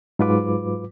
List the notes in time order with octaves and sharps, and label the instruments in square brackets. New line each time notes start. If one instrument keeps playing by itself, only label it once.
[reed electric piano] G#2 F#3 F4 B4 D6